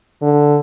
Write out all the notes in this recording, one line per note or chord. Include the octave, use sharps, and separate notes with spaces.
D3